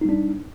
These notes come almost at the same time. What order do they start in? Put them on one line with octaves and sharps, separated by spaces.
D#4 G3 D4